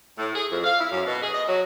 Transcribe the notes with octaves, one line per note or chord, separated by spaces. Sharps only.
A2
G#4
F2
F5
E4
F#2
B2
G#4
D#5
F#3